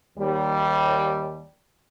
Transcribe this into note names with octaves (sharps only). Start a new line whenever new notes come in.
D#2 G3